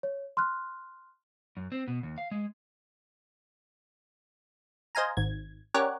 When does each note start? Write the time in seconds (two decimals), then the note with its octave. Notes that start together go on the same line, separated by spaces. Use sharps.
0.03 C#5
0.37 C6 F6 F#6
1.57 F#2
1.72 C4
1.88 B2
2.03 D#2
2.18 F5
2.31 G#3
4.95 C5 D#5 F5 G#5 A#5
5.17 G#1 G#6
5.74 C#4 G4 A#4 C#5 D5 F#5